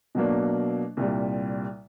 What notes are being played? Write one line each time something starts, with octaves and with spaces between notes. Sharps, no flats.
B2 F#3 A#3 D4
C2 A#2 G3